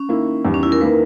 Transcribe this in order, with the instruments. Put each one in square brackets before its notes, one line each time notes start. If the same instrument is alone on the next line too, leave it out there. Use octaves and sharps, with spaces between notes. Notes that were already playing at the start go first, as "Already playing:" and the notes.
Already playing: [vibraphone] C#4
[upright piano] D#3 A#3 E4
E2 D#3 G3
[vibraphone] C#4
E4
A#4
[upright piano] D#3 A#3 E4 [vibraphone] B4